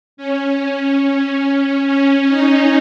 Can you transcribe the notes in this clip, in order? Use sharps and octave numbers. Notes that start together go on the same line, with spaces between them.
C#4
C#4
D#4